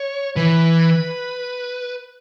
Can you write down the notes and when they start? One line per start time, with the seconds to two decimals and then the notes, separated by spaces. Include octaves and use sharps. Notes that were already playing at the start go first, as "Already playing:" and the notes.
Already playing: C#5
0.36 E3 B4